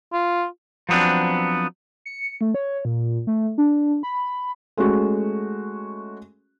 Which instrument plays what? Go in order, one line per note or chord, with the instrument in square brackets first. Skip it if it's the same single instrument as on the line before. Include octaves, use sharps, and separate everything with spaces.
[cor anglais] F4
[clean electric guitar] F3 F#3 B3 C4 D4
[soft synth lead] C#7
A3
C#5
A#2
A3
D4
B5
[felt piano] G#3 A3 C#4 F#4